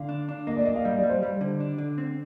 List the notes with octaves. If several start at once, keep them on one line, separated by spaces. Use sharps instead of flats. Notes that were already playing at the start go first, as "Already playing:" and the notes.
Already playing: D3 F5
D4
D4
A#3 D#5
D5
A#3 D#5
F5
G3 D#5
D5
G3
C5
G3
D3
D4
D3
C4